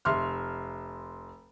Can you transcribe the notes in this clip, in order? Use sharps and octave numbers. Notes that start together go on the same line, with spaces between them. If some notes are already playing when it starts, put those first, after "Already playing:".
F1 E5 C6 F6